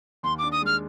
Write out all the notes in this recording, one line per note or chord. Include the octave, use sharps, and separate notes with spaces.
D#2 C6
D4 D6
D#6
G#3 F6